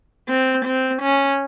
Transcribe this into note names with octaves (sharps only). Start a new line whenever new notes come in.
C4
C4
C#4